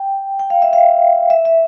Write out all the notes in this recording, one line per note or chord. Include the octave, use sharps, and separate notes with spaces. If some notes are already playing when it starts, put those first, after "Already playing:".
Already playing: G5
G5
F5
E5
F5
E5
E5